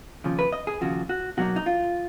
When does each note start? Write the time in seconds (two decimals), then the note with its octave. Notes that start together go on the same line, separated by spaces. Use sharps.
0.24 D#2 C#3 F3
0.39 B4
0.52 D#5
0.67 G#4
0.81 D#2 C#3 F3 F#4
1.09 F#4
1.37 B2 F#3 A#3 D#4 F#4
1.56 D#4
1.66 F4